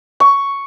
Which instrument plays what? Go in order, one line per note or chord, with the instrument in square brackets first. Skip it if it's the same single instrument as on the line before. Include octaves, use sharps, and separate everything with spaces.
[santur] C#6